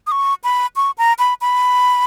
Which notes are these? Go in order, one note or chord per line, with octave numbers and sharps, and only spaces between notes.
D#6
C#6
B5
C#6
A#5
B5
B5